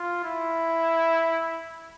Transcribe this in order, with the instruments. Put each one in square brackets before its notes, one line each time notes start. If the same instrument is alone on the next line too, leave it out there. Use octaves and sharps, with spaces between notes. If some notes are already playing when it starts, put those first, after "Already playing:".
Already playing: [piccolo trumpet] F4
E4